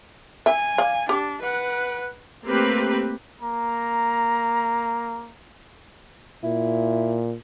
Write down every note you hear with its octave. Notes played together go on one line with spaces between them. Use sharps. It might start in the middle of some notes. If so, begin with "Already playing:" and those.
E5 G#5
D5 F5
D4 G4
B4 F#5
A3 A#3 C4 G4 B4
A#3 A#5
A#2 E4